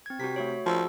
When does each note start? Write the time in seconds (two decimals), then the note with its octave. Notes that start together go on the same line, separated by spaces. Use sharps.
0.06 C4 G#6
0.20 C3 F#4 B6
0.36 A3 F#4 C#5
0.66 F3 F#4 G#4 E6